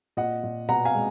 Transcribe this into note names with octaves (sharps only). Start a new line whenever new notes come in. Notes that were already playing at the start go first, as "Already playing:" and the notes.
A#2 D#5 F#5
A#2
B2 F#5 A#5
F5 G#5
G#3